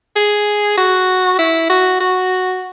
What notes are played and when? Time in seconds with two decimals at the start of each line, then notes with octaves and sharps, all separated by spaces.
0.16 G#4
0.78 F#4
1.39 E4
1.70 F#4
2.00 F#4